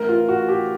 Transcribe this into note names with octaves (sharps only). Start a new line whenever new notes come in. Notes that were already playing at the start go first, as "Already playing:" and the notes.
Already playing: A1 A2 E3 A#4
F4
F#4
G4